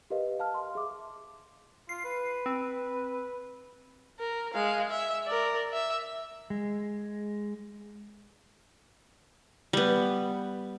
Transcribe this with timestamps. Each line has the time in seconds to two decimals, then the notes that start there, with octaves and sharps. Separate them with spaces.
0.10 G4 A#4 B4 D#5 F5
0.39 F5 A5 F6
0.54 C6
0.75 G#4 E5 D6
1.89 F4 C7
2.04 B4
2.46 C4
4.19 A#4
4.54 G#3 F5
4.90 E5
5.26 A#4 D5
5.73 E5
6.50 G#3
9.73 G3 B3